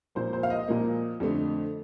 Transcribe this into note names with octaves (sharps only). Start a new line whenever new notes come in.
A#2 F3 A#3 C5
C5
F5
D#5
A#2 F3 A#3
F2 D3 A3